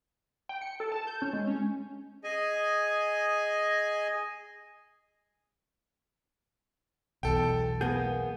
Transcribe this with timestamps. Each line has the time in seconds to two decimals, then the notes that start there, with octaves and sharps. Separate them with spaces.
0.49 G5
0.61 C#7
0.80 A4
0.92 A5
1.07 G6
1.22 C#4
1.33 G#3
1.47 C#4
2.24 G#4 D#5 G#5
7.23 B1 E2 A4 G5
7.81 A#3 B3 G#4 G6